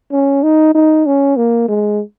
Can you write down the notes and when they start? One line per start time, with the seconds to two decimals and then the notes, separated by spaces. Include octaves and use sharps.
0.12 C#4
0.43 D#4
0.75 D#4
1.06 C#4
1.37 A#3
1.68 G#3